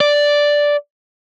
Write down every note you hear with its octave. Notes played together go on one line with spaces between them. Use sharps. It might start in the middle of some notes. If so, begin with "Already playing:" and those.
D5